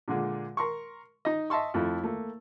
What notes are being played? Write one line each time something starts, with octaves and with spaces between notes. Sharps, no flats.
A#2 D3 G#3
A#4 C6 C#6
D#4 D#5
D#5 E5 A5 C6 C#6
F2 A3 E4
A3 A#3